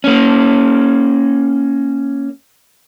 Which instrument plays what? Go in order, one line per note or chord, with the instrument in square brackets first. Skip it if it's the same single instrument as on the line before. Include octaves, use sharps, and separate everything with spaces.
[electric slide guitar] A#3 C#4